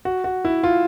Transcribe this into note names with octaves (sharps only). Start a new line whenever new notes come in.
F#4
F#4
E4
F4